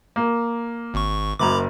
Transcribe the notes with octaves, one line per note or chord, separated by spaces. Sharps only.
A#3
G#1 C#6
F#1 F#2 A#5 B5 D6